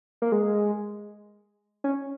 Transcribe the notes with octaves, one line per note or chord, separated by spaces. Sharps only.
A#3
G#3
C#4